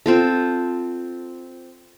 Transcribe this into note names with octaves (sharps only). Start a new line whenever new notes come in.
C4 F4 A4